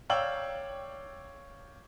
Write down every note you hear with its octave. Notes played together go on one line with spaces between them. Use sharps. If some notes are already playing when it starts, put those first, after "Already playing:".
C#5 D5 F5 G5 E6 F#7